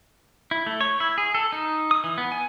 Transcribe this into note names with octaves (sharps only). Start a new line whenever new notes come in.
E4
A3
C#5
E4
G#4
A4
D#4
D#6
E3
B3
G#5